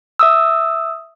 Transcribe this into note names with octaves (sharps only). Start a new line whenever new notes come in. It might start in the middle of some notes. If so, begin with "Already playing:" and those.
E5 D#6 E6